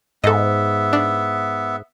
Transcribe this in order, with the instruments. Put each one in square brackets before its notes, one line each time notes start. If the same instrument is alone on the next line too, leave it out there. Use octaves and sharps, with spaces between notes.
[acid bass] G#2 [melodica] B3 E5 [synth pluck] A4 D#5
[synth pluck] D4